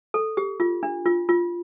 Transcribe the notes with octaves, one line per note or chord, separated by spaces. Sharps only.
A4
G4
F4
D4
F4
F4